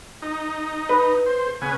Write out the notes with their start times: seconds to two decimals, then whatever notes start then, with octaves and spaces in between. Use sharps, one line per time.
0.22 D#4
0.89 B4
1.26 C5
1.62 C#3 B3 G#5